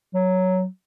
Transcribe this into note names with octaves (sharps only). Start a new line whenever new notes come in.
F#3